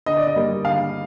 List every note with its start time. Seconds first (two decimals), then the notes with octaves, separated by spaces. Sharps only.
0.06 D3 D#5
0.17 D5
0.27 D#5
0.36 G3 A#3
0.64 D3 F5